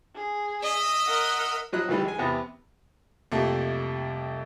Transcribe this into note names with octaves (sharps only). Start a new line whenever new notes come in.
G#4
D#5 E5
A#4 F#5
F3 F#3 D#5 F#6
D2 D#3 E3 G3 G#3
G#3 G#5
E2 C3 B3
C2 F2 C3 A3 A#3